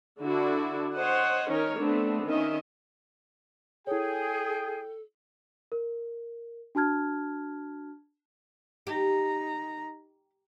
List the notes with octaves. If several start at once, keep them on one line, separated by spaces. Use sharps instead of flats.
D3 D4 E4 F#4
C5 C#5 D#5 F#5
D#3 C#4 D#4 A#4 C#5
A3 B3 C4 D4
D#3 C#4 D#5 E5
E4 G#4 A4 C#5 G5
A#4
D4 F#4 A5 F6 G#6
D#4 G4 A#5